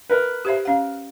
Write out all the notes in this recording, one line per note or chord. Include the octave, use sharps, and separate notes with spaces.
A#4 B4
G4 C5 E5
C#4 F5